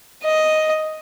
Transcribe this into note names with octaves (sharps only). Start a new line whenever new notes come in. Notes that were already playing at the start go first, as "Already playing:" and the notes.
D#5